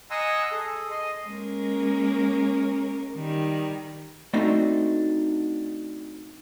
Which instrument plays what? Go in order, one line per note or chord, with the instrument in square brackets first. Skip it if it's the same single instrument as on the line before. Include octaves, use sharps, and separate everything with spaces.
[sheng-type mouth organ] D#5 F#5 G#5 A#5 C6 E6
G#4 A4
D#5 C6
[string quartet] G#3 A#3 C#4 A#4
D#3 G3
[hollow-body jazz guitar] A3 C4 D4 D#4 F#4